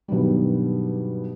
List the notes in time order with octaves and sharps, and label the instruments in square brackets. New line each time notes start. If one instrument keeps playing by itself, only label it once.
[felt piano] G2 B2 D#3 F#3 G3